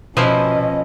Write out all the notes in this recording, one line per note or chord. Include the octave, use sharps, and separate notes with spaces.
B2 F3 C#4 E4 B4 C5 D#5 F5